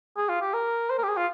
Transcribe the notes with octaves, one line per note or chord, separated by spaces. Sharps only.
G#4
F4
G4
A#4
C5
A#4
G4
G#4
F4